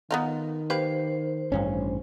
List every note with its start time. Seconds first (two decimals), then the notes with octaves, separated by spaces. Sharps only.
0.11 D#3 B3 D#4 F4
0.70 A#3 G4 B4 C5
1.52 A1 G2 C#4